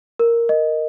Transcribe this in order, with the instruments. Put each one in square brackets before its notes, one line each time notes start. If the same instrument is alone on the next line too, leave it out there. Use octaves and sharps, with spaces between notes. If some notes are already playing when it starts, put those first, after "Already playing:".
[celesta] A#4
D#5